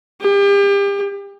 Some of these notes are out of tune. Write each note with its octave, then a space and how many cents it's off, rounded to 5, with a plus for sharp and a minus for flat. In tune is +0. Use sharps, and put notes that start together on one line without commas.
G4 +35